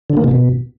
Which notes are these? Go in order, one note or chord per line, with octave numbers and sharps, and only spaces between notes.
D3
A#3
C3
B2